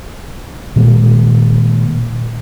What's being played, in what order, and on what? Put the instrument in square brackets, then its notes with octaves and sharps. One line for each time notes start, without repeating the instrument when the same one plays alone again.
[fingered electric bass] A#2 D#3 G#3 A#3